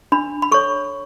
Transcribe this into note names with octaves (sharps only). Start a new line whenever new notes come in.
D4 B5
B5
A4 C#5 C#6